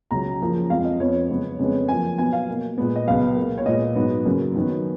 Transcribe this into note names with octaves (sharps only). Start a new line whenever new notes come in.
C#2 C#3 F#3 A#5
F#2 C#3 F3 A#3
F2 F3 G#3 F5
D#5
F2 F3 B3 C#5
F#2 C#3 G#3 B3
F2 C#3 G#3 B3
F#2 F3 A#3 G#5
B2 F#3 B3 G#5
F5
B2 A#3
A#2 G#3 B3
D#5
C#2 B2 F#3 B3 F5
B2 A#3
C#5
A#2 G#3 B3 D#5
G#2 F#3 B3
F#2 C#3 F#3 A#3
F#2 D#3 F#3 B3